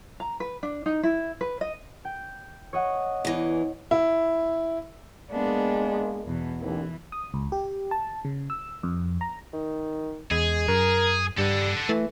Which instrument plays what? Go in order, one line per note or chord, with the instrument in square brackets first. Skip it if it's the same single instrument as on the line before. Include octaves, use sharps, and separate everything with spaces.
[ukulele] A#5
B4
D4
D#4
E4
B4
D#5
[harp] G5
C#5 D#5 F#5
[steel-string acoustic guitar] E2 E3
[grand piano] E4
[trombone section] G#3 A#3 [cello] B3 D4
[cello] E2 B2
[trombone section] A1 D#2 [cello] E3
[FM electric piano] D#6
C#2
G4
A5
C#3
E6
F2
A#5
[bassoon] D#3
[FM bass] E2 [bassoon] G#3 [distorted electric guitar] G#4
[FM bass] F#2 [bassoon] A#4
[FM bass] G2 [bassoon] G3 [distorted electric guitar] A4 F#5
[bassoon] E3 [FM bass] A3